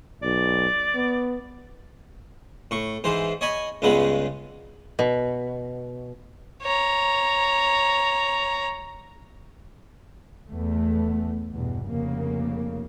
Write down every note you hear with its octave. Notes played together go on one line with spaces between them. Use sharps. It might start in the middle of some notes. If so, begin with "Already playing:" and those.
B1 D5
B3
A2 C#6
G#2 E3 C5
C#5 D#5 G#5 B5
C#2 G2 C#3 G#3 B3 B5
B2
C#5 A#5
E2 A3
E2 G2 B2
F1 C#3 A#3